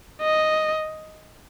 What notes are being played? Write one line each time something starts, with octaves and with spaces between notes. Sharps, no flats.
D#5